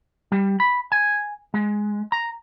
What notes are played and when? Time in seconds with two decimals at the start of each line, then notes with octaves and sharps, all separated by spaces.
0.32 G3
0.60 B5
0.92 G#5
1.54 G#3
2.12 A#5